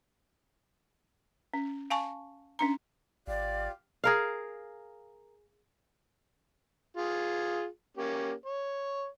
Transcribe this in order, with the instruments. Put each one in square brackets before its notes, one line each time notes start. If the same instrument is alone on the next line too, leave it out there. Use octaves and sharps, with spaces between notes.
[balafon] C#4
F5 G#5 A5 C#6
C#4 D4 A#5
[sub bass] G#1 [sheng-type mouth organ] F4 G4 F5 [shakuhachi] D5
[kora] G#4 A#4 F5
[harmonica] F4 G#4
A#3 C#4 G4
C#5